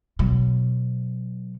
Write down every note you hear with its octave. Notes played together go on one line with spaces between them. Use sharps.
B2 F#3